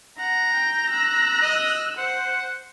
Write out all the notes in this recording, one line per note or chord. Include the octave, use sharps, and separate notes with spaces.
F#5 A#5
G5 G6
E6 F#6
D#5
C5 F#5